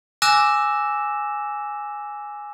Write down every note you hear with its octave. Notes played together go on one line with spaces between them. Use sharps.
G#5 D6 E6 F#6 A#6 E7